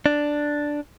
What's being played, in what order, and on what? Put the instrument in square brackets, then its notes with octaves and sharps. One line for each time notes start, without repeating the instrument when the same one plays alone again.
[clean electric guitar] D4